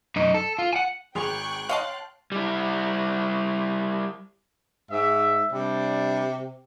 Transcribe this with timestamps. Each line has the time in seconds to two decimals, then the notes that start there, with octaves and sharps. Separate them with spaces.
0.16 F#2 D#4
0.34 A4
0.58 F4
0.73 F#5 G#5
1.15 G#1 G#4 G5 C#6 F#6 F7
1.69 C#5 D#5 F5 A5 C6
2.32 G3 E4
4.91 G#2 E5
5.53 C3 G3 D4